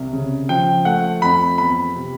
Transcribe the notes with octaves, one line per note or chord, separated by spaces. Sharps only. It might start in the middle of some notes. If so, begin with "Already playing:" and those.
Already playing: C2
C#3
F3 G5
A3 F#5
F2 B5
E2 B5
C3